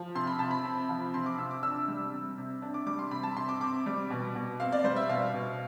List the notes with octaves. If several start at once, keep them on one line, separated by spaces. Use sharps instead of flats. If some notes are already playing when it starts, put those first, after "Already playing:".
Already playing: F3
C3 C6
B5
C3 A5
B5
C4
F3
C3 C6
D6
C3 E6
D6
D4 E6
G3
C3
C3
D4
D6
G3 D6
C6
C3 B5
A5
C3 C6
D6
C4 D6
G3
B2
B2
C4 F5
D5
G3 C5
E5
B2 F5
B2